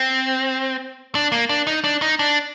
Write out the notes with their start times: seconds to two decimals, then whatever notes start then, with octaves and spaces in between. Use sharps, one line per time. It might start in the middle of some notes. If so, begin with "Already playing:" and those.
Already playing: C4
1.15 D4
1.32 A#3
1.49 D4
1.67 D#4
1.84 D4
2.02 D#4
2.19 D4